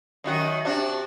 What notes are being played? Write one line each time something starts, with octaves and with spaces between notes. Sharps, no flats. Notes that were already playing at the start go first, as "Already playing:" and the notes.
F#2 D#3 F#4
C3 D4 F#4